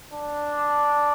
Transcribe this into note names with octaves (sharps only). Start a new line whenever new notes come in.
D4